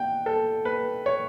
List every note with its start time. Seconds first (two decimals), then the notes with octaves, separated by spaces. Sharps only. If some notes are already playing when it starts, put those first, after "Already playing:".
Already playing: F#5 G5
0.26 A4
0.65 B4
1.06 C#5